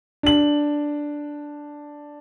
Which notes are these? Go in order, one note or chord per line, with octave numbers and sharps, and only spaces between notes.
D4 F#7